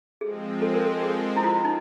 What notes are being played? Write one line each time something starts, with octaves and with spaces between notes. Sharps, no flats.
F3 G#3 C4 G#4
A4
A#4
A4
G#4
E4
F4
D#4